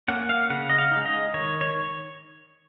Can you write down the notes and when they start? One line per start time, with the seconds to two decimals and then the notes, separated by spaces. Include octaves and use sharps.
0.08 A#3 C#4 F#5
0.29 F5
0.50 C#3 F#5
0.70 D#5
0.78 F5
0.91 D#4
0.96 G#3
1.06 D#5
1.34 D#3 C#5
1.61 C#5